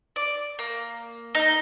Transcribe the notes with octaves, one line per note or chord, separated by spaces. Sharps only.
D5
A#3
D#4